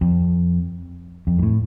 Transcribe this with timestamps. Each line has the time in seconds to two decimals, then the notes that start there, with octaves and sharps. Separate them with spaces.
0.01 F2
1.27 F2
1.39 G2
1.42 A2